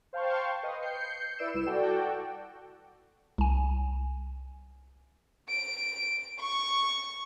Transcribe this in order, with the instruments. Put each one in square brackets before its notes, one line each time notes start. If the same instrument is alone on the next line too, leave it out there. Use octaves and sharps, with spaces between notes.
[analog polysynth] C5 F5 G5 A5 C6 C#6
B4 D#5 G5 D#6
G6 C7 C#7
E4 B4 D5 E6 D7 E7
C2 E4 E7
F#4 A4 D5 G5
[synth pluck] C2 G#5
[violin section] D7
C#6